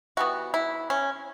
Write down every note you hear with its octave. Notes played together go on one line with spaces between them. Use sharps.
E3 G3 B3 F#4
E4
C#4